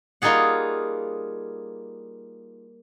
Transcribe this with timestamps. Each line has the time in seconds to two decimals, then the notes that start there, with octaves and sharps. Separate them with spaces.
0.22 G3 A#3 D#4 F4 G#4 F#5